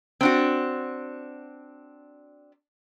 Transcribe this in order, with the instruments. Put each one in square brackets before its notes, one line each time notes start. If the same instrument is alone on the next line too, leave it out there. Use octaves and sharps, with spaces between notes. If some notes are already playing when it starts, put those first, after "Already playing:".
[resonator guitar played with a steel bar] C4 D4 F#4